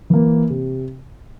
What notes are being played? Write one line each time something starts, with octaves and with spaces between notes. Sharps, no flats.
E3 A#3
C3